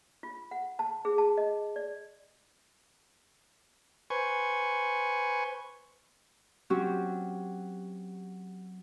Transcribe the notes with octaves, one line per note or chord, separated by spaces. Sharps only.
F4
F#5
A5
G#4
A5
D#5
D5
B4 C5 G#5 C#6
F#3 C4 C#4 F#4 G4